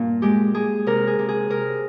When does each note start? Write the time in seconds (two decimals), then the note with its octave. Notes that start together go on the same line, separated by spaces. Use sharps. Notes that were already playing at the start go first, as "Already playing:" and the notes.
Already playing: G2 A#2 A#3
0.22 G#3 G4
0.54 G#3 G#4
0.87 C3 A#4
1.07 G#4
1.19 C3
1.28 G#4
1.50 C3 A#4